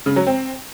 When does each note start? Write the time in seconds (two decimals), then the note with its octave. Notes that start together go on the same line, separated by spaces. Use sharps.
0.06 C#3
0.16 F#3
0.27 C4